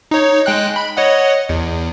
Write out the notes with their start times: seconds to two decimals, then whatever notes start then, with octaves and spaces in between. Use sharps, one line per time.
0.11 D#4 C#5
0.46 G#3 G5 F#6
0.76 B5
0.97 C#5 D#5 F#5
1.49 E2